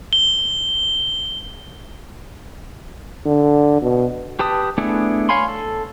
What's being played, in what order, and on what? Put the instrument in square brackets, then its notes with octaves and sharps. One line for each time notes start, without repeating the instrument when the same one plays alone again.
[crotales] G7
[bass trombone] D3
B2
[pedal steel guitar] G4 B4 A5 D#6
A3 B3 D4 E4 G#4
C#5 F5 G#5 B5 C6
A4